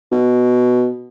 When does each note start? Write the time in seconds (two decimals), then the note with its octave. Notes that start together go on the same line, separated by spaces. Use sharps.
0.12 B2